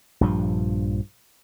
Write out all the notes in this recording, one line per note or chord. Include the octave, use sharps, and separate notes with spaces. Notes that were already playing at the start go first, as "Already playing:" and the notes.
A#1 G2 F3